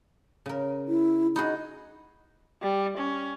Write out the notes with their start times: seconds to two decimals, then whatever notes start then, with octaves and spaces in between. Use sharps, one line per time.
0.46 C#3 A#4
0.88 E4
1.36 D#4 F#4 G#4 B5
2.62 G3
2.97 C#4